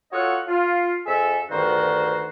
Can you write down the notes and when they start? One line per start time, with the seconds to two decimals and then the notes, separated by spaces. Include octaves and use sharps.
0.12 F4 F#4 A4 C#5 D#5 F#5
0.48 F4
1.06 F2 G#4 A4 E5
1.51 D2 G2 D#3 D#4 F#4 C5